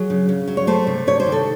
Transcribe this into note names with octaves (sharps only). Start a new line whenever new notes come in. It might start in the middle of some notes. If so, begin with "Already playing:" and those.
Already playing: F#3 G#4
C#3
C#3
F#3
C#5
A3 C5
C3
C3 C#5
C5
D#3
A4